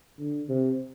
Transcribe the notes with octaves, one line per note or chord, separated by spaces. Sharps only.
D3
C3